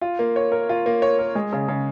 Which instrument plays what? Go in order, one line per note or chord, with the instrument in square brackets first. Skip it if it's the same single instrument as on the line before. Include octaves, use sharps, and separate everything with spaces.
[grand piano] F4
A#3
C#5
A#4
F4
A#3
C#5
A#4
G#3
C#3
C#3